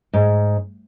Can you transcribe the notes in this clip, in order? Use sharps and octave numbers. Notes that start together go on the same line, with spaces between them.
G#2